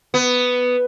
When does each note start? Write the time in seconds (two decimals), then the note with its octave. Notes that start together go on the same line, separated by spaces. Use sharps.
0.14 B3